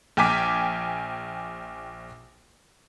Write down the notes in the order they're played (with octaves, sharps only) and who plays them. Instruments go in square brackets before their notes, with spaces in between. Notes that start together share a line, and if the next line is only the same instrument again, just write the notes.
[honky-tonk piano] A#1 G5 G#5 D6 B6